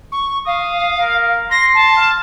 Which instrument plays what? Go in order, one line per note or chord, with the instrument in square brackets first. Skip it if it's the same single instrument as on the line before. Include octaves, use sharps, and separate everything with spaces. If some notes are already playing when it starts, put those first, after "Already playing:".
[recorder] C#6
[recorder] F5 [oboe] D#6
[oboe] A#4
[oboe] C6 [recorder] A#6
[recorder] A5
[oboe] F5